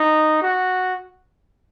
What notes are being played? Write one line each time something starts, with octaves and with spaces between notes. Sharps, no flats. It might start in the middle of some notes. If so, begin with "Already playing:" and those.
Already playing: D#4
F#4